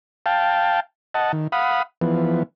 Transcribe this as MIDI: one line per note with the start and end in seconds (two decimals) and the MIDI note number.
0.26 0.80 77
0.26 0.80 79
0.26 0.80 81
1.14 1.32 75
1.14 1.32 78
1.14 1.32 81
1.33 1.47 51
1.52 1.82 77
1.52 1.82 78
1.52 1.82 83
1.52 1.82 87
2.01 2.43 52
2.01 2.43 53
2.01 2.43 59